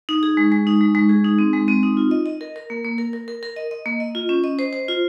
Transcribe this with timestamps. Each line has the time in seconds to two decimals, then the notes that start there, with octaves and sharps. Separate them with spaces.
0.09 D#4
0.23 G#4
0.37 G#3
0.52 G#3
0.67 D#4
0.81 G#3
0.95 G#3
1.09 G#4
1.25 D#4
1.39 C4
1.53 G#3
1.68 C4
1.83 D#4
1.97 F4
2.11 D#5
2.26 D#5
2.41 A#4
2.56 A#4
2.70 A#3
2.85 A#3
2.98 A#4
3.13 A#4
3.28 A#4
3.43 A#4
3.56 D#5
3.71 D#5
3.86 A#3
4.00 D#5
4.15 F4
4.29 C#4
4.44 D#5
4.59 C5
4.73 C5
4.88 F4